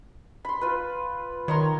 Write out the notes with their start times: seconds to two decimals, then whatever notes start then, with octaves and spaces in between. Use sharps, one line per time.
0.45 B5 C6
0.61 F4 B4
1.48 D#3 C#5 A#5 C6